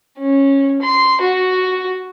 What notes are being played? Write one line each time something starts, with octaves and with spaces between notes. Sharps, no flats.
C#4
C6
F#4